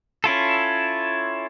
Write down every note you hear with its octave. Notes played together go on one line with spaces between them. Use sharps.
C#4 E4 F4 A4